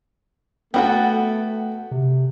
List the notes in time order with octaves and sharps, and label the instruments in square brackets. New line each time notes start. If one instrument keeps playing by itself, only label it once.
[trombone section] A3 [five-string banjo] B3 F#4 A4 [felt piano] F#5 G5
[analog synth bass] C3